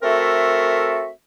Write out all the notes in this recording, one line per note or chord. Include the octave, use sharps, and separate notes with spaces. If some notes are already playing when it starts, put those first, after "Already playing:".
A3 C4 F#4 A4 A#4 E5